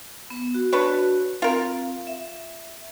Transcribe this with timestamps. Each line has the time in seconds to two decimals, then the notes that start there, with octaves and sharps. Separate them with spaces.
0.30 B3
0.55 F#4
0.73 D4 F#4 B4 C#5
1.42 C4 F4 A#4 F5
2.07 E5